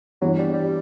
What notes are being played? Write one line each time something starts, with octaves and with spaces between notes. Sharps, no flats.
G2 E3 F#3 B3
G3
G3